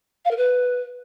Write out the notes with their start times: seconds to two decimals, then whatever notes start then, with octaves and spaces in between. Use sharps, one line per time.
0.25 F5
0.31 A#4
0.37 B4